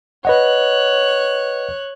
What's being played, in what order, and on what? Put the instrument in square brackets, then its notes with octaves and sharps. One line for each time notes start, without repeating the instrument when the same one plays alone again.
[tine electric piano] B4 D#5 F#5 [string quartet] C#5 F#6